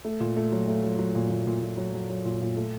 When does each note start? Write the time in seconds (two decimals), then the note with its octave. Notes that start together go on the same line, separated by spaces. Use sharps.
0.05 A3
0.20 A#2
0.36 A3
0.52 F#3
0.68 A3
0.84 F#3
0.99 F#3
1.15 A#2
1.30 A#2
1.47 A#2
1.62 A#2
1.77 F#3
1.94 F#3
2.10 F#3
2.25 A#2
2.41 A#2
2.57 A3